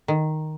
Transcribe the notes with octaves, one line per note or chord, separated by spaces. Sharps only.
D#3